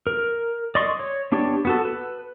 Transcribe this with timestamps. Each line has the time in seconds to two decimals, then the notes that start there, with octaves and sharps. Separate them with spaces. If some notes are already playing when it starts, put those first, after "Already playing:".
0.07 A#4
0.75 D5 D#5 C6 C#6
0.99 C#5
1.32 B3 D4 G4 C#5 D5
1.65 B3 F#4 A4
1.85 B4